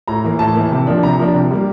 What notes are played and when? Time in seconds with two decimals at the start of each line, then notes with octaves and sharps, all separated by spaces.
0.08 A2 A#5
0.24 E3 A#3
0.39 A2 A5
0.55 E3 A#3
0.71 C3
0.87 F3 A#3 D4
1.03 C3 A#5
1.19 F3 A#3 D4
1.34 C3
1.51 G3 A#3